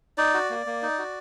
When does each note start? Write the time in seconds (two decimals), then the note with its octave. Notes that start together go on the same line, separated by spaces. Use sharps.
0.18 D#4 D5
0.34 F#4
0.50 A#3
0.66 A#3
0.82 D#4
0.99 F#4